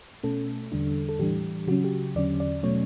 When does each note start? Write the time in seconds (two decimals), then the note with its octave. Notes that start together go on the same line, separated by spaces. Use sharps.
0.23 B2 A3 C#4 A4
0.72 E2 D3 G3 D4
1.09 A4
1.19 A2 E3 G3 D4 G4
1.67 C#3 F#3 C#4 F#4
1.84 G4
2.15 E2 D3 F#3 C#4 D5
2.40 D5
2.63 B2 F#3 A3 C#4 C#5